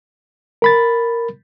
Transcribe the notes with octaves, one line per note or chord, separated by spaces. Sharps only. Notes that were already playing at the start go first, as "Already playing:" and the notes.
A#4 B5 A6